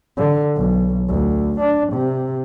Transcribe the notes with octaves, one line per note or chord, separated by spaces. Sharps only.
D3
B1
D2
D4
C3